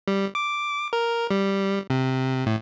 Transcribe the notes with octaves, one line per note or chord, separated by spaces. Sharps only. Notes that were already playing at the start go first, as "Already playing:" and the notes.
G3
D6
A#4
G3
C3
A2